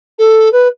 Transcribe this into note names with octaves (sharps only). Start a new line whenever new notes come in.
A4
B4